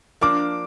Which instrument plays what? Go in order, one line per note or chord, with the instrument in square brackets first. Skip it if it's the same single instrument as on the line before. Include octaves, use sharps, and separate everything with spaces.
[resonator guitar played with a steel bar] F3 A#3 D4 [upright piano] D6